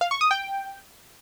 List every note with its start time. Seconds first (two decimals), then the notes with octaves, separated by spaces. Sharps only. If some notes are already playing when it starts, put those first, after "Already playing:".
0.01 F5
0.11 C#6
0.21 D#6
0.31 G5